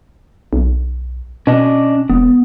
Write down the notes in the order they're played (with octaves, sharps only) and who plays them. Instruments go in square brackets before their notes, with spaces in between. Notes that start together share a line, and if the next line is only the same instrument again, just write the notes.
[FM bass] B1
[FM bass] B2 [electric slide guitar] C#4 D4 D#5
[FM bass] E1 [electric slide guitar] B3